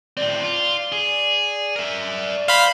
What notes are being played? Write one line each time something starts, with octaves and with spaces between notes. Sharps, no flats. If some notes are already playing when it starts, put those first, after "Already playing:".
A2 C4 D5
F4
G#4
A#4 E5
C5 F5 B5